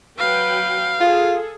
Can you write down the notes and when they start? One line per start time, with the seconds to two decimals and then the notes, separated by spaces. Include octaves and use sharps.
0.19 F#3 B4 F5 G5
1.00 F4 G#4 A4